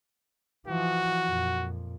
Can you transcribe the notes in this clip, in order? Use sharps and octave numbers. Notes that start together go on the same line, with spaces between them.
E3 F3 F#4
F2 A#2